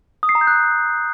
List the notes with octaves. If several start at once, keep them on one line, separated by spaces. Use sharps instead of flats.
D#6
C7
A#5
G6
F#6